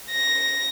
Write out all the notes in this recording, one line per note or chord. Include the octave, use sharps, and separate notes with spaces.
A#6